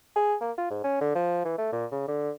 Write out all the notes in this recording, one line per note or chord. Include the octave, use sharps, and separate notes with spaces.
G#4
A#3
F4
G#2
C#4
D3
F3
E3
A3
A#2
C#3
D3